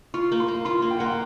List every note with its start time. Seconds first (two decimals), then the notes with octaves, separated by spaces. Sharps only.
0.14 F4 C#6
0.32 A#3
0.40 C6
0.48 A#3
0.65 F4 C6
0.82 A#3
0.91 G5
0.99 A#3 F#5
1.06 G5